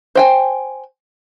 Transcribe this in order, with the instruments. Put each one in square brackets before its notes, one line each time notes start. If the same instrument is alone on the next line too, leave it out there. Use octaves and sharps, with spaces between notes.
[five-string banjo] C5 G5 G#5